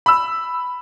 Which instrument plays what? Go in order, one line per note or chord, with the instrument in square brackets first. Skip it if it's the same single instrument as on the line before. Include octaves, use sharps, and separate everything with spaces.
[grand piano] B5 E6